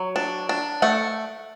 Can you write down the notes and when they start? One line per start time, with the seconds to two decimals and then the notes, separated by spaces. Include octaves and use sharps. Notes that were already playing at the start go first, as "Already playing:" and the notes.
Already playing: F#3
0.16 D4
0.49 D4
0.82 A3 F#5